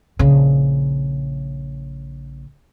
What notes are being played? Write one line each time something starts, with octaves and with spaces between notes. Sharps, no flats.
A#1 C#3